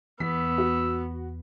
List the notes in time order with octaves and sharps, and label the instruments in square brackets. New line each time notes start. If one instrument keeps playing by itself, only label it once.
[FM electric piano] E2 [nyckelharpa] B3 [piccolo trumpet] E6 [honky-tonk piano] B6
[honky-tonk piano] F#4